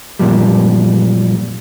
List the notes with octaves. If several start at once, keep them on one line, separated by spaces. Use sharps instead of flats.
F#2 A#2 F3 G3